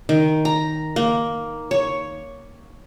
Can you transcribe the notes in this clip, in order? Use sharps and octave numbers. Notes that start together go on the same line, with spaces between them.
D#3
A#5
A#3
C#5